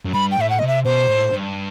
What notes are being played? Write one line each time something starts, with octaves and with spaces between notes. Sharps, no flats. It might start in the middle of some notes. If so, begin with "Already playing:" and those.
F#2
G2 B5
G5
A2 E5
F#5
C3 D#5
E5
B2 C5
A2
G2